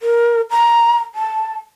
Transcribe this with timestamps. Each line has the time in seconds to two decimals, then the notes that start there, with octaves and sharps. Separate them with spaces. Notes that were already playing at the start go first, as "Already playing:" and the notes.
0.01 A#4
0.51 A#5
1.15 A5